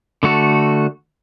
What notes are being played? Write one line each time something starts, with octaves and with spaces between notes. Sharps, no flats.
D3 A3 F#4 A4